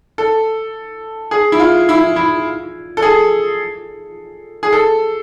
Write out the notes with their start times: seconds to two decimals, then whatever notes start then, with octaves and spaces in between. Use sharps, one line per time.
0.18 A4
1.31 G#4
1.52 E4
1.60 F4
1.89 E4
2.16 E4
2.97 A4
3.02 G#4
4.63 G#4
4.73 A4